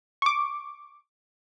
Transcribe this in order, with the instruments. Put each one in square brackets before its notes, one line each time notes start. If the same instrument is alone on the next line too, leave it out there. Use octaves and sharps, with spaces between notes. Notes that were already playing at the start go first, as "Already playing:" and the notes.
[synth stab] C#6 D6